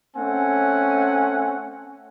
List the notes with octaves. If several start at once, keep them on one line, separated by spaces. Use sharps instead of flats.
A3 C4 C#4 F#5 G#5